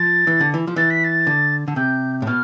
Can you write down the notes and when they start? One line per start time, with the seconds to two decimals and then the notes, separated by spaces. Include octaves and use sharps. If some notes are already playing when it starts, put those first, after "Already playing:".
Already playing: F3 A6
0.27 E3
0.41 D3
0.54 E3
0.67 F3
0.76 E3 A6
0.90 B6
1.04 A6
1.27 D3
1.68 D3
1.76 C3 G6
2.22 A2
2.27 B2 F6